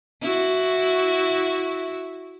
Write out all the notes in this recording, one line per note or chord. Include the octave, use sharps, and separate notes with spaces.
E4 F#4